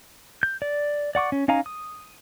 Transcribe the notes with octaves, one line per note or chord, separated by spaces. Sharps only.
G6
D5
D5 F#5 C#6 D6
C#4
C#4 D#4 F5 G#5 A#5
D#6